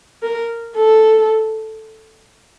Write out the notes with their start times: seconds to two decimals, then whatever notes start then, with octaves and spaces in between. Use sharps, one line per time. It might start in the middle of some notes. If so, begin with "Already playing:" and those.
0.23 A#4
0.76 A4